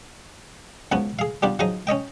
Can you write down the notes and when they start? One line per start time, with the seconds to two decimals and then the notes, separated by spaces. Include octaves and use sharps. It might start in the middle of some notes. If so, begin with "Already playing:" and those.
0.92 C#2 F3 B3 F#4 G#5
1.19 G#4 F5
1.42 G3 B3 D4 F4 G4
1.59 F3 F#3 D#4 G#4 D#5 D#6
1.87 C#4 C#5 D#5 G5